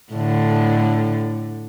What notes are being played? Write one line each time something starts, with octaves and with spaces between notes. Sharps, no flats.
A2 D3